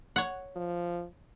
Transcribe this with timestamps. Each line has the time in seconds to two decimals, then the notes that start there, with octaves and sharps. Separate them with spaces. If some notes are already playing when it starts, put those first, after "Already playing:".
0.16 C#5 F#5
0.56 F3